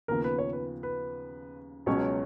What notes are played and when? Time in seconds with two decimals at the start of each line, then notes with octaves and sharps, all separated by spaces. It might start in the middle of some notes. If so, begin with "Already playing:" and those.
0.08 D#2 C#3 F3 B3 A#4
0.24 B4
0.38 C#5
0.53 B4
0.83 B4
1.86 C#2 B2 F#3 C#4 C#5